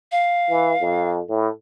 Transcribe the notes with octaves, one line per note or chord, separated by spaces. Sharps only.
F5
E3
F2
A2